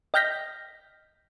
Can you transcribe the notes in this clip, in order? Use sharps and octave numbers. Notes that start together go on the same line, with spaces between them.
D#5 G5 F6 G6 A#6 B6